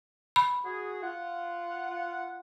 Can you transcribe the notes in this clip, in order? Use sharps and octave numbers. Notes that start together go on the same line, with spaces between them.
B5
F#4 G#4
F4 F#5